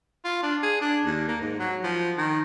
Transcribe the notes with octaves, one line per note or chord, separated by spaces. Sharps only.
F4
D4
G#4
D4
D#2
A#3
G#2
F#3
F3
D#3